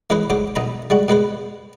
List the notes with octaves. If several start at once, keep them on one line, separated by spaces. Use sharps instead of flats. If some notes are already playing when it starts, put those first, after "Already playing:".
E3 G#3 C#4 G#4 B4 C5
G#2 F#3 C5 D6
B1 D#4 A#5 B5
G3 G#3 F#4
B2 G#3 B4 C5